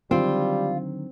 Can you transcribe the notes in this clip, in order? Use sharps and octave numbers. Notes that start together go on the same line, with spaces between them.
D3 D#3 F#3 G3 C4 F4